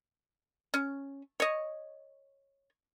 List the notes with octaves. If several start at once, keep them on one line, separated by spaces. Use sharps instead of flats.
C#4
C#5 D#5